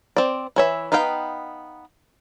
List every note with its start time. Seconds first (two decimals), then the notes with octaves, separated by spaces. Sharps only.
0.16 C4 D5
0.56 E3 C#5 E5
0.92 B3 D#4 B4 F5 G5